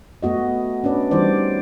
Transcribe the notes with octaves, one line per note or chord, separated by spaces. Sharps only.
A3 B3 F#4 D#5
C#4 D4 B4 D5
E3 G3 D#4 C5 D5